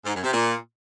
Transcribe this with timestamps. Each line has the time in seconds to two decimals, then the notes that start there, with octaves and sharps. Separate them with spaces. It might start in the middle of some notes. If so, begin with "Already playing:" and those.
0.05 G#2
0.14 F#2
0.23 C3
0.32 A#2